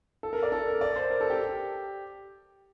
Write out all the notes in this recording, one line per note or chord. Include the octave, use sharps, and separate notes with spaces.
A4
A#4
D5
A4
A#4
D5
C5
A#4
A4
G4